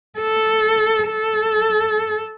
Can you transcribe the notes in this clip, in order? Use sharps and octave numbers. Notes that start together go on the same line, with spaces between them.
A4
A4